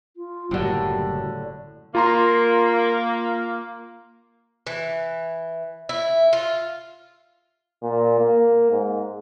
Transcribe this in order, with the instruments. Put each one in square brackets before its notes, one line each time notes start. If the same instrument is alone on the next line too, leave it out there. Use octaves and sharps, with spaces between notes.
[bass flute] F4
[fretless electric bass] F#1 F#3 A#3 [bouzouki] A2 D3 [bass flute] G3
[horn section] A#3 [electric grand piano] F4 A#5 C6
[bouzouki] E3
E4
F4
[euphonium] A#2
A#3
G#2